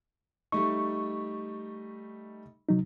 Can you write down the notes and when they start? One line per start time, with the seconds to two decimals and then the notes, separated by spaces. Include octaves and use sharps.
0.52 G3 A3 D#4 C#6
2.69 C3 F#3 D#4